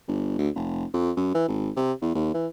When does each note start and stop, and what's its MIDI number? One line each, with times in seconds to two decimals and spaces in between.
0.08 0.38 31
0.39 0.49 38
0.55 0.85 29
0.94 1.11 41
1.17 1.33 42
1.35 1.46 52
1.48 1.70 32
1.77 1.93 48
2.02 2.11 40
2.15 2.30 39
2.34 2.47 52